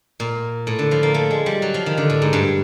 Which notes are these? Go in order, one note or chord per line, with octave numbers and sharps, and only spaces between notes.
A#2
A2
D3
F3
A#3
A3
G#3
G3
F#3
F3
D#3
D3
A2
G#2
G2